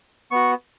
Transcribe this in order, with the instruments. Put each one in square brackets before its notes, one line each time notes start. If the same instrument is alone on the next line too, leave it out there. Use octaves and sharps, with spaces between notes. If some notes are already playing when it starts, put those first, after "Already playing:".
[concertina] B3 F#4 C#6